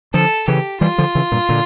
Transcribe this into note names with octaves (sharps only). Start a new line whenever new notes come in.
D3 F3 A4
C#3 E3 G4
E3 G3 F4
D3 F3
C#3 E3
G2 A#2
A#2 D3